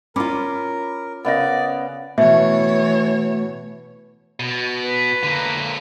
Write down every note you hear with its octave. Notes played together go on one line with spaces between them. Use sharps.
C#4 F4 A#4 B5 D6
C#3 B3 A#4 D5 D#5 A#6
B2 E3 A3 C#5 E5
B2
B4
D3 A#3